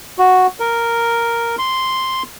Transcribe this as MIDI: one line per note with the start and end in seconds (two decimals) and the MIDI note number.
0.19 0.47 66
0.60 1.56 70
1.58 2.23 84